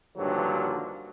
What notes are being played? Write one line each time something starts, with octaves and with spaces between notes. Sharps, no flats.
G2 A#2 D3 D#3 F3 F#3